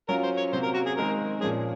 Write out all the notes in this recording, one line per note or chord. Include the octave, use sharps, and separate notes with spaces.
F#3 C#4 F4 A#4
C5
C#5
C3 F#3 A#3 C5
A#4
F#4
G#4
D#3 G#3 C4 A#4
A#2 F3 A#3 C#4 G#4